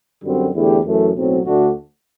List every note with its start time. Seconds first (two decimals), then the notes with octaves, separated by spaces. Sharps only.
0.23 F#2 D3 G3 C4 F#4
0.54 E2 D3 A3 E4 G4
0.85 F#2 E3 A3
1.15 B1 A2 F#3 C4
1.45 D2 D3 A3 D4 F#4